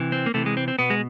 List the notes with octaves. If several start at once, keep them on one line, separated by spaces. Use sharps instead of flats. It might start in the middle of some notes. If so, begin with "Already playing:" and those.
Already playing: C3 E3
C4
A#3
C3 E3 A3
G#3
C4
C4
B2 B3
G#3